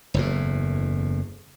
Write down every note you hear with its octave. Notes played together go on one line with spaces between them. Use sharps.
F#1 E2 A2